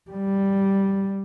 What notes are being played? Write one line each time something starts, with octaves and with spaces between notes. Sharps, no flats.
G3